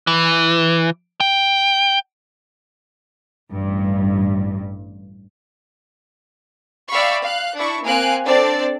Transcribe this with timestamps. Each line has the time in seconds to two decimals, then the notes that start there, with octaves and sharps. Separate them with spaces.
0.07 E3
1.20 G5
3.52 A1 G2
6.91 D5 E5 F5 G5 B5 C#6
7.23 F5 F#6
7.56 D4 E4 C#6
7.85 A#3 C4 F5 G#5 F#6 D7
8.27 C4 D4 A4 C5 D5 A5